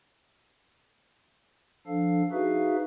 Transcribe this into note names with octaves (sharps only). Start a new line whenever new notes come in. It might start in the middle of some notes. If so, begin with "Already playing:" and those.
F3 D4 A4 F5
D#4 F#4 G#4 B4 E5 F5